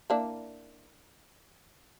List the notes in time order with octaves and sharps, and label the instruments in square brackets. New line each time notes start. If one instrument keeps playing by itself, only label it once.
[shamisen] A#3 D4 E4